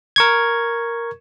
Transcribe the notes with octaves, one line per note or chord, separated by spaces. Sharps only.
A#4 C#6 G#6